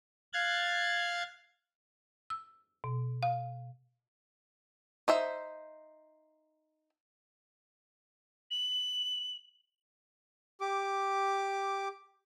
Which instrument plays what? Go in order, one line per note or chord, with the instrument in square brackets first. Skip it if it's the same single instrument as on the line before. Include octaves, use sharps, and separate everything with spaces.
[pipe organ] F5 F#6 G#6 A6
[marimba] E6
B2
F5
[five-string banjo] D#4 C5 E5
[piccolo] F#7
[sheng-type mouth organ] G4 D6